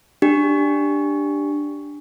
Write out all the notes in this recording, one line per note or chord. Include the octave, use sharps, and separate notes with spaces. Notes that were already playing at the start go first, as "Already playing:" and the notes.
D4 G4